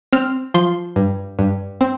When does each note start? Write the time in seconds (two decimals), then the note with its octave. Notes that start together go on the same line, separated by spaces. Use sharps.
0.13 C4 F6
0.54 F3 C6
0.96 G2
1.39 G2
1.81 C4